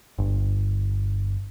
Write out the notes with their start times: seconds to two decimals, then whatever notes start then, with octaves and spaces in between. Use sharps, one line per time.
0.18 G1